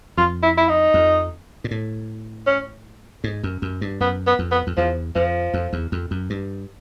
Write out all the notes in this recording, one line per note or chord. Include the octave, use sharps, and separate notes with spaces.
F2 F4
E4
E4
D#4
F2
A#2
A2
C#4
G#2
F#2
F#2
G2
F#2 B3
B3
F2
B3
F2
E2 F3
F2 F3
F2
E2
F2
F#2
G2